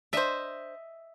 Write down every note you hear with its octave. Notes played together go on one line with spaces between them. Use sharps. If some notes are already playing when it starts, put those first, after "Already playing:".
D4 C5 D#5 E5